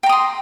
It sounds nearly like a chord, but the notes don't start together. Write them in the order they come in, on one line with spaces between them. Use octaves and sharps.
G5 A#5 D#6 C6